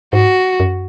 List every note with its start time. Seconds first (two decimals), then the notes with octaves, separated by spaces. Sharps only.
0.13 G#2 F#4
0.60 F#2